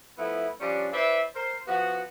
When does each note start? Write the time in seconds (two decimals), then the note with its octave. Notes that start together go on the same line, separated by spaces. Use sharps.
0.18 F3 A3 B3 E4
0.60 F3 G3 C#4 D4
0.93 E4 B4 C5 D5 E5
1.35 A#4 C5
1.67 F3 B3 F#4